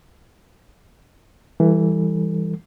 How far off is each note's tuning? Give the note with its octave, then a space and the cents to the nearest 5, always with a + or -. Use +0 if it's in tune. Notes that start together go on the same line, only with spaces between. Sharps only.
E3 +0 G3 +15 A4 +30